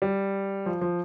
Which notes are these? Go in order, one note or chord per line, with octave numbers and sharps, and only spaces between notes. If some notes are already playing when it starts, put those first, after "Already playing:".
G3
F3
F3